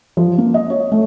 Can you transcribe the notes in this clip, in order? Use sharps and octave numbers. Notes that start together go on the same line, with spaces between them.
F3
A#3
D#5
C#5
A3